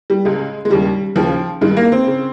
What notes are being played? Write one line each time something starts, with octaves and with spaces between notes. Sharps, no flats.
G3
C#2 C#3 G#3
G#3
D#2 C#3 G3
D#2 C#3 F3
G2 D#3 G#3
A#3
C4
C#3